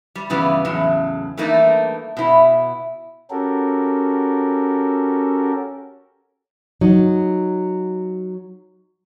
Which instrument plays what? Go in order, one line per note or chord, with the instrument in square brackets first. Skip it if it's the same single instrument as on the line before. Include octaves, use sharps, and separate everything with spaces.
[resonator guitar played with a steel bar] G3
G2 C#3 E3 G3 B3
E2 A2 C#3 F#3
E3 G3 A3 A#3 D4 D#4
B2 E4
[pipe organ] C#4 F#4 G4 A4 A#4
[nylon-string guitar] F#3 D#4